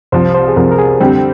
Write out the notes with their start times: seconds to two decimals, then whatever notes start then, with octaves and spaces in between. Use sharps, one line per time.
0.12 C2 C3 F3 C5
0.34 C5
0.48 G#4
0.56 C2 C3 F3 A#4
0.72 A#4
0.79 G#4
1.00 D3 G3 C4 G4